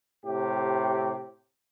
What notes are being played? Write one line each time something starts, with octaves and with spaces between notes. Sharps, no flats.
A2 C3 G4